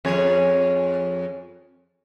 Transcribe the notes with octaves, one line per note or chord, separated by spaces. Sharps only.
F2 G#4 C#5